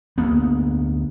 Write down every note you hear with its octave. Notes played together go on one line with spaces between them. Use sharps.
D2 A#3 B3